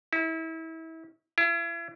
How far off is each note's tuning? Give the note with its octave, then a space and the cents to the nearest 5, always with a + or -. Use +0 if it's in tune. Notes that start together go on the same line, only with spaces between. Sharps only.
E4 -30
E4 +40